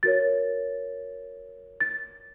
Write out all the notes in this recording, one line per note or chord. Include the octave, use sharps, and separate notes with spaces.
F#4 A#4 C#5 A6
A6